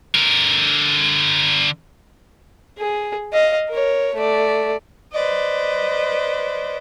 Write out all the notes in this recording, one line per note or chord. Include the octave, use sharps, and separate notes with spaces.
D3 A#4
G#4
D#5 F5
A#4 C#5
A3 D5
B4 C5 D5 D#5